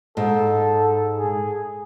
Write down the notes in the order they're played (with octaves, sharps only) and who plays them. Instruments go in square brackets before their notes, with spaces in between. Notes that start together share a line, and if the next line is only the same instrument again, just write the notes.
[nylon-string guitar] G#2 [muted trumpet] A4
[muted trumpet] G#4